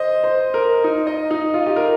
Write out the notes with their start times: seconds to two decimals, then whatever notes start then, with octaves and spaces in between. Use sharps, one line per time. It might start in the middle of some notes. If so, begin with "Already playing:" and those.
Already playing: C5 D#5
0.24 C5
0.54 A#4
0.84 D#4
1.07 D#5
1.31 D#4
1.54 F4
1.67 G4
1.76 A#4